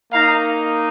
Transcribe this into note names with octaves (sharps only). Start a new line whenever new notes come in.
A#3 D#4 F5 A#5